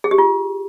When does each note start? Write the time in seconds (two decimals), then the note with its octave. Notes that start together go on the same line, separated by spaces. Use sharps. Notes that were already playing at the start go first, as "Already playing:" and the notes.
0.04 G#4
0.11 G4
0.18 F4